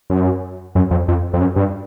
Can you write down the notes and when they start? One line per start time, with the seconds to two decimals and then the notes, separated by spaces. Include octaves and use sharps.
0.10 F#2
0.75 F#2
0.91 F2
1.08 F2
1.33 F2
1.40 F#2
1.56 G2